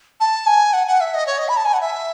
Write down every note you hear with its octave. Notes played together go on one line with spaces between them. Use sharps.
A5
G#5
F#5
F#5
E5
D#5
C#5
D#5
B5
A5
G#5
F#5
E5